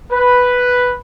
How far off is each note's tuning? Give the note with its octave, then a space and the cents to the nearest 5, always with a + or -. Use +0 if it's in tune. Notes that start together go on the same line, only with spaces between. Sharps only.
B4 +0